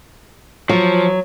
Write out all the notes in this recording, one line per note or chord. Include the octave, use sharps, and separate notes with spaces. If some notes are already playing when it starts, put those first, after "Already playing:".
F3 F#3